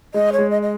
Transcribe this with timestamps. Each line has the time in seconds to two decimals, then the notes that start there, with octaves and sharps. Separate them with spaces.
0.14 G#3 D#5
0.33 C#5
0.38 G#3
0.51 D#5
0.62 D#5